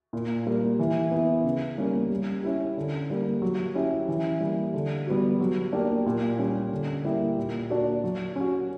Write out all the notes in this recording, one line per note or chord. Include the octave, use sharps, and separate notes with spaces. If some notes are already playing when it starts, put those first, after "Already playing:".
A#2
G3 A#3
E3
B3
E4
C#3
G3 A#3 C#4
G3
C#4 E4 G4
D3
G3 A#3
F#3
C#4 E4 G4
E3
G3 A#3
D3
G3 B3 F#4
F#3
A#3 D4 G4
A#2
G3 C#4 G4
D3
G3 A#3 E4 G4
A#2
A#3 D4 F#4
F#3
C#4 F#4